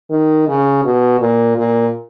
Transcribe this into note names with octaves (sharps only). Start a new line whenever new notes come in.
D#3
C#3
B2
A#2
A#2